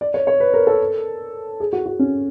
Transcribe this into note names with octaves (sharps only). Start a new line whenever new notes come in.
D5
C#5
C#5
B4
A#4
A4
G#4
F#4
F#4
C#4